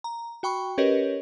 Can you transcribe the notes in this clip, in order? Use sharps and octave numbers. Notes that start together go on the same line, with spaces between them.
A#5
F#4 G5 B5 C#6
C#4 G4 A#4 B4 C#5 D#5